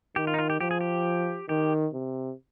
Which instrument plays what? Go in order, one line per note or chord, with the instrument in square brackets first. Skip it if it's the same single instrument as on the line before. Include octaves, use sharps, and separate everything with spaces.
[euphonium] D#3 [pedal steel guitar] G4
[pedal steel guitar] F4
D#4
F4
G4
[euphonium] F3 [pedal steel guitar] G4
[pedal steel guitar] G#4
G4
[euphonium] D#3 [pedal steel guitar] G4
[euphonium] C3